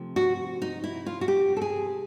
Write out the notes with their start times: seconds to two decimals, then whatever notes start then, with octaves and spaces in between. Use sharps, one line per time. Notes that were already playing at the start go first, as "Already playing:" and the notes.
Already playing: C3 F3 A3
0.16 F#4
0.62 D#4
0.84 E4
1.07 F4
1.21 F#4
1.28 G4
1.57 A4
1.62 G#4